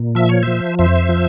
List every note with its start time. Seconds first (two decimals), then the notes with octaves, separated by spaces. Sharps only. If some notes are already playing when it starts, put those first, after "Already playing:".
Already playing: A#2
0.15 F3 E5
0.29 C#5
0.43 F3 C5 E5
0.79 F2 C5 E5
1.09 F3